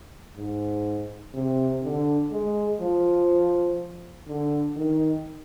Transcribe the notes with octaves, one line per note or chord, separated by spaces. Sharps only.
G#2
C3
D3
G#3
F3
D3
D#3